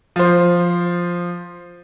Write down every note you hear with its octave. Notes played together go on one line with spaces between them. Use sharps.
F3 C5